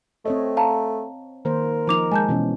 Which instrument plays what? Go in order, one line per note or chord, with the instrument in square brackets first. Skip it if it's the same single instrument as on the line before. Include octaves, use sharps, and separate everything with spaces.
[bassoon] A3 [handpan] C4 C#5 D#5
[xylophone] F5 A5 A#5
[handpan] D#3 A#3 C5 [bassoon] A#4
[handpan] F3 D#4 [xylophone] A#5 D6 F7
[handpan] G#3 [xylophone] G#5 A5 G6
[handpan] B2 E3 C#4